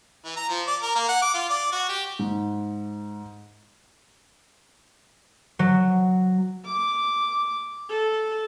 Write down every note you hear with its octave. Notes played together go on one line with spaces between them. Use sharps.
E3
A#5
F3
D5
A#4
A#3
F#5
D6
F4
D5
F#4
G4
G#2
F#3
D6
A4